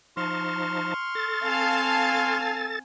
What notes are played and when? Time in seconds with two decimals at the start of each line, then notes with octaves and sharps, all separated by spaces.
0.17 F3 D#4 A5 C6 C#6 F6
1.15 A4 A6
1.45 C4 F5 G#5 A5